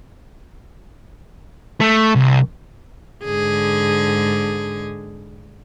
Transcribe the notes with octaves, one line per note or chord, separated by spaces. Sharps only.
A3
C2
G#2 D3 G#4